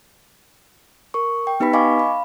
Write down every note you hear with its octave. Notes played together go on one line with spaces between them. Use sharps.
A#4 C#6
G5
B3 D#4 G4 B4 B5 B6
D#5 F5 G#5 B5 C#6 D6
F5 B5